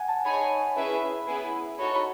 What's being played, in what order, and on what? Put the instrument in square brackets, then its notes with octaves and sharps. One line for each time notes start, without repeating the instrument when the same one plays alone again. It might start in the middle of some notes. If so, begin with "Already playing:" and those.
Already playing: [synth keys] F#5 G#5
A5
[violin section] D#4 G#4 C#5 G#5 [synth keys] B5
[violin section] C#4 E4 G#4 B4 E5
B3 E4 G#4 B4
[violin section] D#4 F#4 A4 C#5 [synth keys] B5
[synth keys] A5
B5